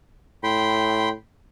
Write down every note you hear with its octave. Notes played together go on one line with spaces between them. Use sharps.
A2 G5 B5 C6